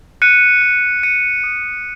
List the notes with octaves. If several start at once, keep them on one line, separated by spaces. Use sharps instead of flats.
F#6 C#7 D#7
F#6
F#6 C#7 D#7
D#6